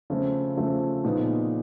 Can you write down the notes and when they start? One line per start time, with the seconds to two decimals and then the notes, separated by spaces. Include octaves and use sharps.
0.10 C#3 F3 A3 C4
0.57 C#3 F3 A3 C4
1.04 A#2 F3 G#3 B3 D#4